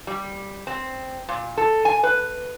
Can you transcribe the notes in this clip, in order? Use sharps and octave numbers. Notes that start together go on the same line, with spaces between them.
G3
C4
A#2
A4
G#5
B4